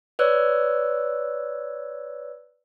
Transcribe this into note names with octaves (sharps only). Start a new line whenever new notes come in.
B4 C#5 D5 E6 F#6